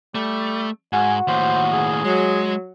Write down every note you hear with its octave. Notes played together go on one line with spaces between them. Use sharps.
G3 A3
G#2 F#4 G#5
D#2 A2 C5
G#4
F#3 G#3